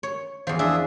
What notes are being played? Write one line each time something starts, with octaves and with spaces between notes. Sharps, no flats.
C#5
E2 F3
D4 G#4 E5